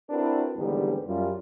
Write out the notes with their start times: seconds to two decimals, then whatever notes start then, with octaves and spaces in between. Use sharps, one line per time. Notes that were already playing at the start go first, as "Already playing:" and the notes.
0.10 C4 D4 E4 F#4 A#4 B4
0.57 D#2 G#2 D3 E3 G3 B3
1.07 F#2 G3 F4